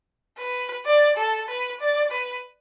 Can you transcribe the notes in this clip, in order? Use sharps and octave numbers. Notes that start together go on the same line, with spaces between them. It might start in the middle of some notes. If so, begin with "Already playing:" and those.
B4
D5
A4
B4
D5
B4